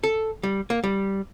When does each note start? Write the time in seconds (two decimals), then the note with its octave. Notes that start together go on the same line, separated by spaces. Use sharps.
0.04 A4
0.43 G3
0.70 A#3
0.84 G3